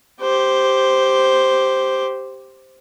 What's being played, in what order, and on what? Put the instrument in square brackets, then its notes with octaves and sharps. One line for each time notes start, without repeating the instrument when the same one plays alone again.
[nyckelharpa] G4 C5